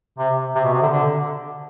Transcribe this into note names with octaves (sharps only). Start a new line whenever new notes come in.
C3
C3
B2
C3
D3
D3